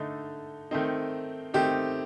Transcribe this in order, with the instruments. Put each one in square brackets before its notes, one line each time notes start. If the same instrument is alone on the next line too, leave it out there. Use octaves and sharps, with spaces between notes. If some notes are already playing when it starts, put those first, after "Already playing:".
Already playing: [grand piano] D3 A3 D#4
D#3 A3 C4 D#4
D#3 A3 C4 D#4 G4